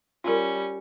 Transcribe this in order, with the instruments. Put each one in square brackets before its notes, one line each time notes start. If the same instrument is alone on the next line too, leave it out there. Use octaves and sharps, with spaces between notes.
[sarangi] G3 [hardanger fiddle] C#4 [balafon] F4 A#4